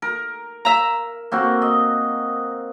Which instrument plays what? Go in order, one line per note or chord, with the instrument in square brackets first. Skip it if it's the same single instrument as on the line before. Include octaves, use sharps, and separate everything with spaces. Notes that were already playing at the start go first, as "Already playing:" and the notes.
[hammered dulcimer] A#4
[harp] E5 A#5
[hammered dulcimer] A#3 C4 F#4
D#5